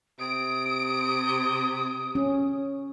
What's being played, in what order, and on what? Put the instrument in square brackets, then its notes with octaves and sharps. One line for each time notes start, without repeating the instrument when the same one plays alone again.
[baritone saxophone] C3 [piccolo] D#6 [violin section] D7
[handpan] C#4